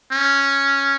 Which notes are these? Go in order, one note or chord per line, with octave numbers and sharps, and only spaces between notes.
C#4